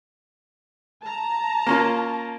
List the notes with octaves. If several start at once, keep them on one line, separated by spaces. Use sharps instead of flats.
A5 A#5
A#3 C#4 F4